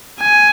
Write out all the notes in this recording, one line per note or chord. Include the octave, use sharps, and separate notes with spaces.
G#5